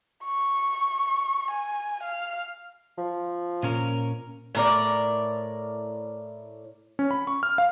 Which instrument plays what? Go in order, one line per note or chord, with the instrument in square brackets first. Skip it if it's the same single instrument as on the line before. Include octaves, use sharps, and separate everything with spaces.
[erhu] C#6
G#5
F5
[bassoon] F3
[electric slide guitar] A#2 C#4 A#4
[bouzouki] A2 A#4 D5
[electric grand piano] C#4
B5
C#6
F6
F5